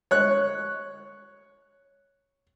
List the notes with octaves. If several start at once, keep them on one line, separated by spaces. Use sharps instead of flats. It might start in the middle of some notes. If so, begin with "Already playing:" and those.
C#5 F#6